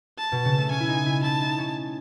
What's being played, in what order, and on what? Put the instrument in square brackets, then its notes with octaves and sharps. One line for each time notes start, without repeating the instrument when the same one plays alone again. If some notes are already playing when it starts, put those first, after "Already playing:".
[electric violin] A5
[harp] B2
C#3
A3
[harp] C#4 [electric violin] G#5
[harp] E4
D#4
E4
[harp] E4 [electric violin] A5
[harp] D#4
C#4